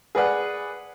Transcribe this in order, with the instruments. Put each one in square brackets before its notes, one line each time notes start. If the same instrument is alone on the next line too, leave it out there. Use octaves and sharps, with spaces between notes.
[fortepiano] G#4 B4 D5 F#5